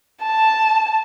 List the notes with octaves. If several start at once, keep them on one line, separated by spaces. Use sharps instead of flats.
A5